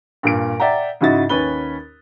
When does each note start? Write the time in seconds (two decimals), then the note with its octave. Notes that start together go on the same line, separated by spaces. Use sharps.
0.23 G2 A#2 D7
0.60 D5 E5 F#5 G5 A#5
1.01 G#2 C#3 E4 F#4 D#5 A6
1.29 D#2 C#4 B4 B5 G7